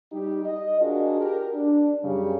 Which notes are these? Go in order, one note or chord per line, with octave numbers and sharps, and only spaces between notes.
G3 D#4 G4
D#5
D4 F4 F#4 G#4 A#4
G4 A#4
D4
F#2 C#3 G3